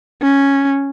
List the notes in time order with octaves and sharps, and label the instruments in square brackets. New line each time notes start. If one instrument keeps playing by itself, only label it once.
[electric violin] C#4